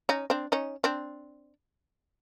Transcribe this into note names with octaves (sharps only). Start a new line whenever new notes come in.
C#4 D#4
C4 D4
C#4 D#4
C4 D4